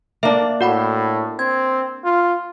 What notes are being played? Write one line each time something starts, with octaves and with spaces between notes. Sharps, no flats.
A#3 D4 E5
A2 F#4 F#5 B5
C4 G#6
F4